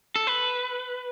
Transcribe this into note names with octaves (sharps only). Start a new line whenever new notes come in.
A4
B4